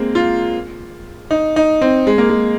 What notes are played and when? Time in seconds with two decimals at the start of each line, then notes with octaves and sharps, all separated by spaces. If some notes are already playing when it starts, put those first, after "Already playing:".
Already playing: G#3 A#3 C4
0.15 F4
1.31 D#4
1.56 D#4
1.81 C4
2.07 G#3
2.18 A#3
2.30 G#3